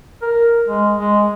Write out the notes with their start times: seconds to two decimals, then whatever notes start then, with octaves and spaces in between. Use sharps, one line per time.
0.22 A#4
0.68 G#3
0.96 G#3